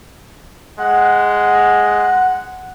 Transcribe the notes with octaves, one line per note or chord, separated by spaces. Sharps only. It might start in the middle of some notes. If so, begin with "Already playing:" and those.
G#3 F#5